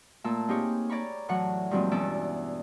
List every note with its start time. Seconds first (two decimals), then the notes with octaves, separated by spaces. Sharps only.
0.24 A#2 A3 A5 E6
0.48 A#3 C4 D#4 G4 G#4 C#5
0.90 C#5 D5 A#5 B5 C#6
1.29 A2 E3 F#3 F#5
1.71 G2 A#2 E3 F#3 G#3 C4
1.91 E2 B2 C#4 D5 E6